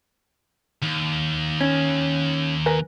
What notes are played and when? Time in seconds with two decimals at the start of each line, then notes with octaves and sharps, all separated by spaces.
0.83 D#2
1.61 C#4
2.66 A#4 B4 G#5